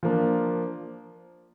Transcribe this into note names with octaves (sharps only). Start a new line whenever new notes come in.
F3 A#3 D4